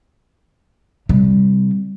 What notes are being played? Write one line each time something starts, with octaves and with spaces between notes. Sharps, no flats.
C3 G3